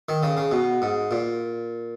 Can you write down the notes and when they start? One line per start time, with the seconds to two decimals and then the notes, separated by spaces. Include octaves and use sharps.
0.09 D#3
0.23 C#3
0.37 C#3
0.52 B2
0.82 G#2
1.11 A#2